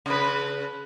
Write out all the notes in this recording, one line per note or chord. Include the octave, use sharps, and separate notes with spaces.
C#3 B4